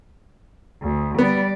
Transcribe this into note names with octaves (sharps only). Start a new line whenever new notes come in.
D2
G3 B3 D5